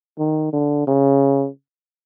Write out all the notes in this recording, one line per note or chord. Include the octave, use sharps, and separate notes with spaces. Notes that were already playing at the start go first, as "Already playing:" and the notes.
D#3
D3
C#3